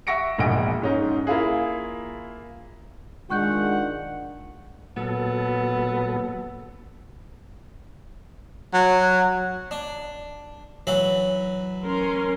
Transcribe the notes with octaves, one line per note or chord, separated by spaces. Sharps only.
E5 F#5 C#6 A#6 C#7 D7
E1 A#1 A#2 D#5 F#5 D7
G#2 C#4 D#4
A#3 E4 F4 G#4
D#3 G#3 D4 F4 F#5 C#6 F#6 G6
A#2 F#3 B3 A4
F#3
D4
E3 F#3 B5
C#4 A#4 C6